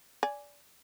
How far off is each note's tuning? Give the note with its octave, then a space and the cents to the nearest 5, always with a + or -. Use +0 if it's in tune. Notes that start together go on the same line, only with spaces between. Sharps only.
D5 -20 G#5 +0